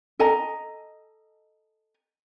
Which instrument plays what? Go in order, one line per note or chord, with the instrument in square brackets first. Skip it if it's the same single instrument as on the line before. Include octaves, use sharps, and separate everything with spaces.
[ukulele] A4 D#5 G#5 A#5